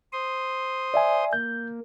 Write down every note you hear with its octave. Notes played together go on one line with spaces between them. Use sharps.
C5 C6 D#6
D5 E5 G#5
A#3 G6